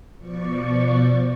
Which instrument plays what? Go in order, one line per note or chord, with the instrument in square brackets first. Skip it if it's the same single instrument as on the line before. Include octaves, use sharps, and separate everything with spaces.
[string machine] B2 F3 D5 C#6